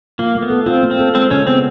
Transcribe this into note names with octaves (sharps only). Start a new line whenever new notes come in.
A#3 F4
A3
B3
A4
C4 F4
A#3
C4
A4
G#3 C4
C#3 C#4
B3 C4